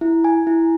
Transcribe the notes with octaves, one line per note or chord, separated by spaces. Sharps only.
E4
G#5
E4